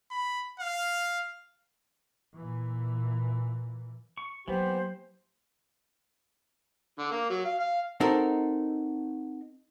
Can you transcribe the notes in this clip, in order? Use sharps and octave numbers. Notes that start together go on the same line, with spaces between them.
B5
F5
A#2 E3
C#6
E3 F#3 A#3 B3 G4 B4 C5
D3
A#3
F#3
F5
F5
C4 D#4 F#4 A4 A#4